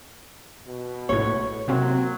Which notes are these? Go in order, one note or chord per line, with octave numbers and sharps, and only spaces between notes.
B2
A#1 A2 C#5
C3 F#3 A#3 C4